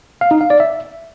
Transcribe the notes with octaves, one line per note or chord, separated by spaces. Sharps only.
F5
D#4
F5
D5
E5